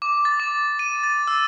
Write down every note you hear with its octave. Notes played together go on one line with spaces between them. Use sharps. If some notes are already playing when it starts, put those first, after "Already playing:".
D6
A6
D6
D#7
A6
E6